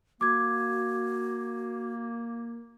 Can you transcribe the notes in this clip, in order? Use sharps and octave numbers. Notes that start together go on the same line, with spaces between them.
A#3 F#4 D6 G#6